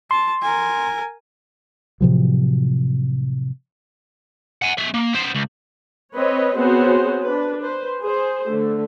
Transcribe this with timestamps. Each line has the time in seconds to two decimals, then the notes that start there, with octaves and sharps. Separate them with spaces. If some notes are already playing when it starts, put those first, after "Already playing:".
0.11 A5 C6
0.42 A#4 G#5
2.01 A2 C3 F3 F#3
4.62 F#5 G#5
4.78 G#3 E5
4.94 A#3
5.13 B3 C5
5.35 C#2
6.14 C4 B4 C#5 D#5
6.55 B3 C4 F#4 G#4 C5 C#5
7.21 D4 B4
7.63 B4 C5
8.02 G#4 C5
8.49 D3 A3